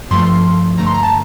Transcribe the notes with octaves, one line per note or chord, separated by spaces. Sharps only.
G2 F3 A3 C6
G2 D3 A3 A#5
C6
A#5
A5